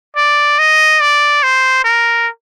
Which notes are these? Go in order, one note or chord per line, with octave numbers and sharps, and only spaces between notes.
D5
D#5
D5
C5
A#4